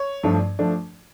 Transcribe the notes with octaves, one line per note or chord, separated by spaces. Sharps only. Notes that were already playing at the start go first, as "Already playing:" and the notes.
Already playing: C#5
G2 F3 A3 D4
F3 A3 D4